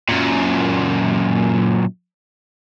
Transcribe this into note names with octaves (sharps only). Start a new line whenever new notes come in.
F#2 A#2